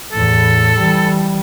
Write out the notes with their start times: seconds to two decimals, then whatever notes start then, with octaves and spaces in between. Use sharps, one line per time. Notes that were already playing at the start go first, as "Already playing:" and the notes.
0.12 E2 A2 A4
0.77 E3 G3